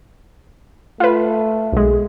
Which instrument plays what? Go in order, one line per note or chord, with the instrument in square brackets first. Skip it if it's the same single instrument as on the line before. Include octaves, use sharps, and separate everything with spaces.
[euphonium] A3 [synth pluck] F4 B4
[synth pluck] B1 G#3